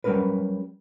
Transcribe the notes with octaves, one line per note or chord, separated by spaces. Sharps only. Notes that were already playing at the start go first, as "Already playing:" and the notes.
F#3 G3 B3 C#4 A#4 B4